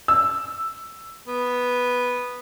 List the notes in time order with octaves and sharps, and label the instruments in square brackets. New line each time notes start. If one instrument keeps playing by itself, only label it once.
[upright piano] E6
[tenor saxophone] B3